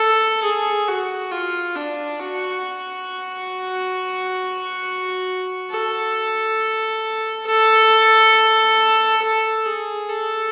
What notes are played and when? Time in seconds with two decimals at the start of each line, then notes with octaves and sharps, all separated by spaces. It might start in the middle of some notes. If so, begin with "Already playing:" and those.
Already playing: A4
0.43 G#4
0.88 F#4
1.31 F4
1.76 D4
2.19 F#4
5.70 A4
7.47 A4
9.21 A4
9.65 G#4
10.09 A4